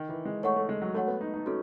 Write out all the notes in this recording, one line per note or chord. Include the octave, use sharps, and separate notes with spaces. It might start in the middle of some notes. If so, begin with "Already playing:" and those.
Already playing: D#3
E3
G#3
A3 C#5 F#5 C#6
A3
G#3
F#3
A3 F#4 A4 C#5 F#5
B3
D#4
D#4
C#4 F#4 A4